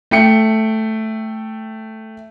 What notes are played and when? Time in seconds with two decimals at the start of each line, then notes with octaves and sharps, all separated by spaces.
0.11 A3 G5 C#7